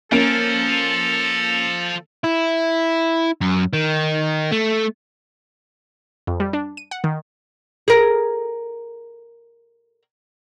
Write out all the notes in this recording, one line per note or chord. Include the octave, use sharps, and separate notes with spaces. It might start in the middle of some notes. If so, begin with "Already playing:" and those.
F3 A#3 C#4 A4 D7
E4
F#2
D#3
A3
F2
G3
D4
D#7
F#5
D#3
G#4 A#4